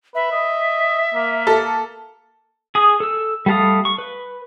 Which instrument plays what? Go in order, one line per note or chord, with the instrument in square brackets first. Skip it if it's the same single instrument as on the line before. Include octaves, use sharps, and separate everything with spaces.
[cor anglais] B4 [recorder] E5
[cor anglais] D#5
A#3
[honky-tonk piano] A4
[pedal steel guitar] G#4 D#6
A4 E6
G3 A3 A4 F5 D#6
C#6
B4